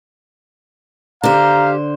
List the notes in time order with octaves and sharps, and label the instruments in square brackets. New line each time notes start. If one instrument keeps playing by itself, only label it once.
[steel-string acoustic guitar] D3 C5 [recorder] G4 [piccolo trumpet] F5 [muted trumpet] A#5